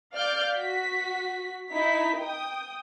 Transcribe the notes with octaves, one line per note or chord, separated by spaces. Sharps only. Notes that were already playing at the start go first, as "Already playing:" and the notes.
D5 F5 F6 G6
F#4 B6
D#4 E4 B6
G5 D#6